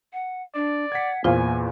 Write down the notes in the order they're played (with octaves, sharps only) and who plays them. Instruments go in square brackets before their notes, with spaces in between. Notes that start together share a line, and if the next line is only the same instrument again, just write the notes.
[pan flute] F#5
[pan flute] D4 [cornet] D5
[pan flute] F#5 [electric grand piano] G#6 B6
[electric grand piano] E2 A#2 [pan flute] A#3 [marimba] F4 C5 F5 [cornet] G#5